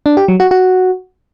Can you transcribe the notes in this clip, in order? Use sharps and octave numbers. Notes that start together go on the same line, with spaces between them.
D4
G4
F#3
F#4
F#4